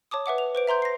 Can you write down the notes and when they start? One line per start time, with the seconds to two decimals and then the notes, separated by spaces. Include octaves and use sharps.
0.11 C#5 A5 D6 D#6
0.26 B4 E5 F#5 D6
0.38 F7
0.55 B4 C5 D7
0.67 E5 A#5 C6 G6
0.82 A#6 C7